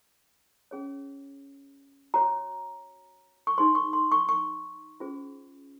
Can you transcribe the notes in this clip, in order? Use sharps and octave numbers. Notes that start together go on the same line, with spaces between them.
C#4 G#4 C#5
F#4 C#5 A#5
C#6
D#4 G#4 C5 C6
C#6
C6
C#6
C#6
C#4 F4 G#4 C5